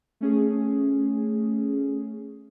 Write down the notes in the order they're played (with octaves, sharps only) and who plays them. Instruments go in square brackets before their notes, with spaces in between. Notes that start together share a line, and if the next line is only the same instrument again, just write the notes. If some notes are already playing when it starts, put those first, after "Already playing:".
[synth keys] A3 C#4 G#4